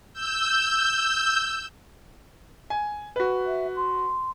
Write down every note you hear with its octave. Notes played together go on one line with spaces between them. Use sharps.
E6 G6
G#5
F#4 B4
E5
C6